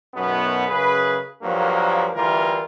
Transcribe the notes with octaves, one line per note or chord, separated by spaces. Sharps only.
B1 F#2 B2 B3
F#2 C#3 G#4 B4
G2 F3 F#3 A#3
D2 E3 G3 F4 A#4